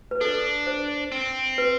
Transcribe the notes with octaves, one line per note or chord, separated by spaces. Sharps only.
B4
D4 A4
C5
C4
B4